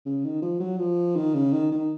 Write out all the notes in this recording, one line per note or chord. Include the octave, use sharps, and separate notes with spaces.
C#3
D#3
F3
F#3
F3
D#3
C#3
D#3
D#3